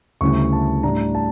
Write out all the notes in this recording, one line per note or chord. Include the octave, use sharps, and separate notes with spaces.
D2 C#3 G3 C#4 E4 C#6
A5
A2 G3 D4 A#5
A5